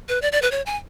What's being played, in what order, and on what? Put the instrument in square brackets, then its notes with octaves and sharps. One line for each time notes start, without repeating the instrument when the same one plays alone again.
[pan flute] B4
D5
D5
B4
C#5
G#5